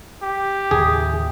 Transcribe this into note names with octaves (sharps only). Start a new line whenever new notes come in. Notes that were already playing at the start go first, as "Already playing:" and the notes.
G4
D#2 A2 C#3 G#4